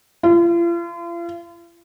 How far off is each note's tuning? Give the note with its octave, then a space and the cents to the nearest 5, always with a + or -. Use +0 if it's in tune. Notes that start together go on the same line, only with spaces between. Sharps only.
F4 -40